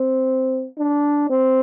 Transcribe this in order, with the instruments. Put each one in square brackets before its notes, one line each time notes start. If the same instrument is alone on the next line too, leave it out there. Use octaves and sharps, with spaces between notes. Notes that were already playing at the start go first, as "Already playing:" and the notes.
Already playing: [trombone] C4
D4
C4